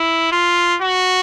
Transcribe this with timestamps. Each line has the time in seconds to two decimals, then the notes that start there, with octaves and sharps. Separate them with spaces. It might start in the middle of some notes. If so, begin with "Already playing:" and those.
Already playing: E4
0.32 F4
0.82 F#4